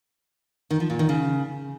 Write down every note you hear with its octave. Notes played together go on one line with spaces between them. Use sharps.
D#3
F3
A#2
D#3
C#3